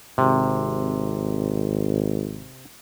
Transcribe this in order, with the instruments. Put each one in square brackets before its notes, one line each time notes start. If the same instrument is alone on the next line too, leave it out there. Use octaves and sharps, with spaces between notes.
[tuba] G#1 [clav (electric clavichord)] C3